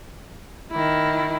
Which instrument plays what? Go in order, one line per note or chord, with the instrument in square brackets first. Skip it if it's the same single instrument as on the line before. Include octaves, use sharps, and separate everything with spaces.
[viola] D#3 E4